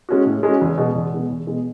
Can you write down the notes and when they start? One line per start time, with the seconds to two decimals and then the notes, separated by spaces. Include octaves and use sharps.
0.09 G#3 C#4 F#4
0.26 A2
0.43 G#3 C#4 F#4
0.61 E2
0.78 B2 G#3 B3
0.95 E2
1.13 B2 G#3 B3
1.29 E2
1.47 B2 G#3 B3